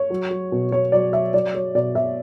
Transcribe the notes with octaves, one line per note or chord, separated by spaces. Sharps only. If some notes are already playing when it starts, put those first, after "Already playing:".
Already playing: C#5
F#3
F#3
B2
B2 C#5
F#3 D5
F#3 E5
F#3 D5
F#3 C#5
B2 D5
B2 E5